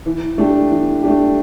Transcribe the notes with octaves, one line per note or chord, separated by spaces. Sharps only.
E3
A3 D4 G4
E3
A3 D4 G4